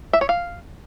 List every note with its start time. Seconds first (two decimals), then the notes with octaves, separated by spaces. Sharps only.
0.13 E5
0.21 C#5
0.29 F5